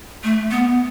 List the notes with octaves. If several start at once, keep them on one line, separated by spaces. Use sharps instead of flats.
A3
B3